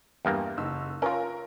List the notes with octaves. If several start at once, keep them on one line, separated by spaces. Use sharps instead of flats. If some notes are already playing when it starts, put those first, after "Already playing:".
E2 G2 A#3
F#1 D#4 E6
C#4 F4 A#4